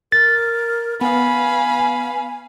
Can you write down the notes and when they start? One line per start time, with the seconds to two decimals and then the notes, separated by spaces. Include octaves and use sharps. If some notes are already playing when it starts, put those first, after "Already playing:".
0.12 A#4 A6
1.01 B3 F5 G#5 B5